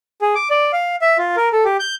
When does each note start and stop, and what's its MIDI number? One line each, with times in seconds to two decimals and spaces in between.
0.21 0.35 68
0.35 0.49 86
0.50 0.72 74
0.73 0.96 77
1.01 1.17 76
1.18 1.36 65
1.36 1.49 70
1.53 1.64 69
1.65 1.77 67
1.80 1.95 91